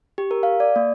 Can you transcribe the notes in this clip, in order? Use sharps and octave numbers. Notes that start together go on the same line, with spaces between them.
G4
A#4
F5
D5
A#3